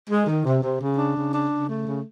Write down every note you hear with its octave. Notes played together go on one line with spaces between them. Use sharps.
G#3
D#3
C3
C3
C#3
D4
C#3
D4
C#3
A3
C#3